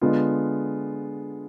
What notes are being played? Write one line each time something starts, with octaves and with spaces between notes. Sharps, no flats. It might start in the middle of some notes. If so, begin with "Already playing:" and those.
D3 G#3 B3 F4